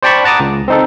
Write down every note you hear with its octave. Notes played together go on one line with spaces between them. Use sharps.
C5 D5 G5 A5 B5 C#6
F#5 A5 A#5 D6 D#6
C#2
C4 D#4 A4